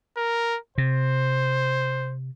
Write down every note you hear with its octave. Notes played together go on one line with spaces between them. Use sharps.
A#4
C3 C5